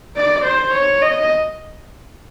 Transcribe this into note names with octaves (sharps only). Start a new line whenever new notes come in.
D5
C5
C#5
D#5